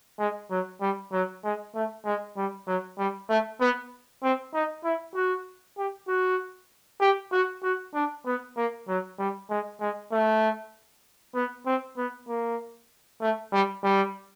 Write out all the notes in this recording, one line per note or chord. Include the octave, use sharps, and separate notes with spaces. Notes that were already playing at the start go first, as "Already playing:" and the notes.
G#3
F#3
G3
F#3
G#3
A3
G#3
G3
F#3
G3
A3
B3
C4
D#4
E4
F#4
G4
F#4
G4
F#4
F#4
D4
B3
A#3
F#3
G3
G#3
G#3
A3
B3
C4
B3
A#3
A3
G3
G3